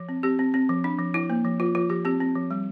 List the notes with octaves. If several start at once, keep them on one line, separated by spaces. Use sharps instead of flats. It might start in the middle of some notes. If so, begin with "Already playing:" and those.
Already playing: F3
C4
C4 G4
C4
C4
F3
D4
F3
F3 E4
A#3
F3
F3 F4
F3 F4
F3 G4
C4 G4
C4
F3
G3